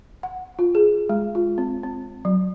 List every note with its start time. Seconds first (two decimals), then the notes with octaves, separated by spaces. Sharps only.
0.23 F#5
0.59 F4
0.75 G#4
1.09 G#3
1.35 F4
1.58 C4
1.83 C4
2.25 F#3